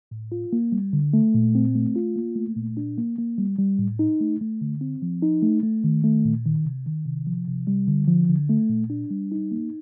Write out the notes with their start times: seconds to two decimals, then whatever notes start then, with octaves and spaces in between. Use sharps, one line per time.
0.11 A2
0.32 F4
0.53 A#3
0.72 G3
0.93 D3
1.13 A3
1.34 A#2
1.55 C4
1.75 A3
1.96 F4
2.16 A#3
2.36 A3
2.57 A#2
2.77 D4
2.98 A#3
3.19 A#3
3.38 G3
3.59 G3
3.79 A2
3.99 D#4
4.21 A3
4.41 A3
4.61 D3
4.81 C4
5.02 F3
5.22 D#4
5.43 A3
5.63 A3
5.84 D#3
6.04 A3
6.25 A#2
6.46 D#3
6.65 C3
6.86 D#3
7.06 C3
7.27 F3
7.48 C3
7.67 G3
7.88 D3
8.08 F3
8.29 D3
8.49 A3
8.70 A#2
8.90 D4
9.10 G3
9.32 D#4
9.51 A#3